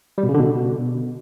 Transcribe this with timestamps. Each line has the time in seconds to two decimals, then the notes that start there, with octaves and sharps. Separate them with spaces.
0.18 G3
0.23 B2
0.29 C#3
0.34 D3
0.40 B2